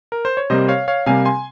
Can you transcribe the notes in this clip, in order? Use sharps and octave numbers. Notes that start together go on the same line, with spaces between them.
A#4
C5
C#5
C3 G3 A#3 C5 D#5
C#5 F5
C#5 F5
C3 G3 A#3 F5 G#5
G#5 C6